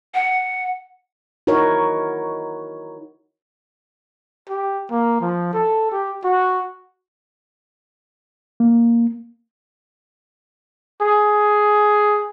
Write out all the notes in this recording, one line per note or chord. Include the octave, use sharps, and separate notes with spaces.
F#5
D#4 E4 F#4 A#4 C#5
G4
A#3
F3
A4
G4
F#4
A#3
G#4